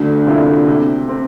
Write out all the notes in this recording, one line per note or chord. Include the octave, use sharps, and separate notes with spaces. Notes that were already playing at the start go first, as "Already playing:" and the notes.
Already playing: D2 D3
C3 F3 A#3 E4
C3
C4